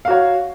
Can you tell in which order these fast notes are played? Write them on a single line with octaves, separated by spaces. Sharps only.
F5 F#4 C#5